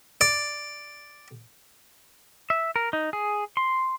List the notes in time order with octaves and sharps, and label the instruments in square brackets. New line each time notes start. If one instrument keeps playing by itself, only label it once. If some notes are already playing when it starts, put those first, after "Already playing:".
[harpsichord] D5
[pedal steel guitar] E5
A#4
D#4
G#4
C6